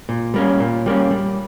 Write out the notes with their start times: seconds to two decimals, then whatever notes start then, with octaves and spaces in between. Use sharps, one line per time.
0.09 A#2
0.34 G3 A#3 C#4
0.60 A#2
0.86 G3 A#3 C#4
1.11 G3